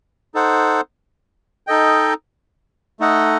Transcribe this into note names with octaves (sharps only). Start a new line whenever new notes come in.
D#4 A4 C5 F#5
D#4 A4 D#5 G5
A3 D#4 A4 D#5 F#5